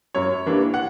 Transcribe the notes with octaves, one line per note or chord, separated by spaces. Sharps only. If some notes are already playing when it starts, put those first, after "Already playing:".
F#2 C#5
E3 G3 A#3 D4
F#5